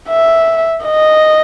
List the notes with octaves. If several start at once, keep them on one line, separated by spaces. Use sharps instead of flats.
E5
D#5